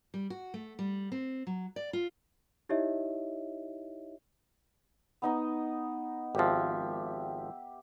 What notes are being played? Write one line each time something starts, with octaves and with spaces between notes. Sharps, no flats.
G3
F#4
A3
G3
C4
F#3
D5
F4
D#4 E4 G4 C#5 D#5 E5
B3 D#4 D#5
G#1 F3 G4 E5